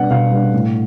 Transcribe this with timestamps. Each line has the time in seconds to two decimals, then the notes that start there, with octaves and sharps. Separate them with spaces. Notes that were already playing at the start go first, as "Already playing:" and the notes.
Already playing: B2 G3 B3 D4 F#5
0.10 B2 F5
0.31 G3 B3 D4
0.53 A2